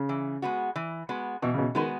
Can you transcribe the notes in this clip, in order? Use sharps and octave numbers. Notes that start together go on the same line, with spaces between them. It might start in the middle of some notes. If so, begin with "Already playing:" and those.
Already playing: C#3
E3
G#3 B3 F#4
E3
G#3 B3 F#4
B2 E3
C#3
B2
D#3 G#3 B3 F#4